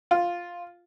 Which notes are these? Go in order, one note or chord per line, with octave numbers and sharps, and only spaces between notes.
F4